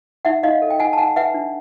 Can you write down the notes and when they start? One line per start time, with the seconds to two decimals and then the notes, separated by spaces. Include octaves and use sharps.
0.25 D#4 E5 F#5
0.43 D#4 D#5 F5
0.62 A4
0.70 G5
0.79 D#4 F#5 G#5
0.93 A5
0.98 D#4 F#5 G#5
1.16 B4 E5 F#5
1.34 D4